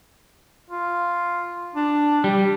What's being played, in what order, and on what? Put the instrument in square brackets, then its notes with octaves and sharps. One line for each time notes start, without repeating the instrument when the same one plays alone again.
[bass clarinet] F4
D4
[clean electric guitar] G3